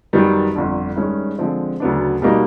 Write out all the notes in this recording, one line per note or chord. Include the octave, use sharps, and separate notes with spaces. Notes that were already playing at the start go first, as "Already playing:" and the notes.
F#2 D#3 G3 B3
G1 F2 D3
G2 D#3 G#3 C#4
D3 F3 G#3 C4
D2 C#3 F#3 B3 D4
B2 G3 A#3 D#4 F#4